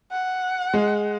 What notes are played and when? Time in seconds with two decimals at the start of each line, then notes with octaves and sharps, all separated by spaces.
0.12 F#5
0.74 G#3